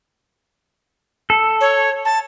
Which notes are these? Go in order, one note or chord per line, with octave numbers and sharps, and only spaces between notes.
A4
C#5
A5